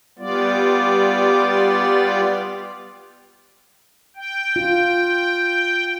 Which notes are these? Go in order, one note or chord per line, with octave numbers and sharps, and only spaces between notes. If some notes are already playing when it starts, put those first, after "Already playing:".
G3 B3 F4 D5
G5
F4